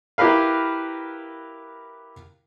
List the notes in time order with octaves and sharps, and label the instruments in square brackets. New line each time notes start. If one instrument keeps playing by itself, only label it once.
[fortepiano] E4 G4 A#4 B4 F5